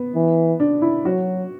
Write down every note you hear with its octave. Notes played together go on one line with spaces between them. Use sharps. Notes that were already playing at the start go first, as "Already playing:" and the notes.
Already playing: B3
E3
D4
E4
F#3 F#4